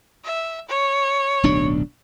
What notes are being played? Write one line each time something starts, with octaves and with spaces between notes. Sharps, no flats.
E5
C#5
D1 B1 D4